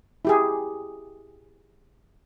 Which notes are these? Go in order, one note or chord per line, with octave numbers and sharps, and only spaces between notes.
E4 G4 G#4